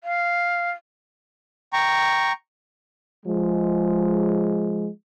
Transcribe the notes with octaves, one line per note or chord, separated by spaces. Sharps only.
F5
G5 A#5 C#6
F3 G#3